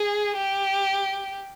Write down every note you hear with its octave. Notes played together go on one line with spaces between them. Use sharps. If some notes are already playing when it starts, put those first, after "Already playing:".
Already playing: G#4
G4